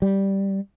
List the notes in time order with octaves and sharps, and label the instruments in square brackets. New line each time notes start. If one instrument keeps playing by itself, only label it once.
[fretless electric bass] G3